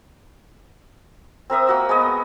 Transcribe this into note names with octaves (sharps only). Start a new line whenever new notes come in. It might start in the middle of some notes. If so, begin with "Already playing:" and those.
C4 A#4 E5 D#6
A#3 F#4 E6
G#3 B3 D#5